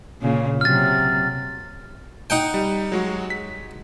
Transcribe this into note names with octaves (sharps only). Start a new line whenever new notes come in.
A#2 C#3 A#3
C3 F#3 F6 A6
D#4 F#5 G5
G3
F#3 G#3 F#4
B6